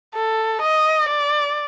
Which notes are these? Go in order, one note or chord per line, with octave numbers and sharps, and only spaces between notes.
A4
D#5
D5